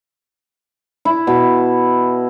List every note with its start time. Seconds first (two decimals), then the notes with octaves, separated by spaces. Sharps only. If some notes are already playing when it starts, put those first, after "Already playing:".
1.05 E4
1.27 B2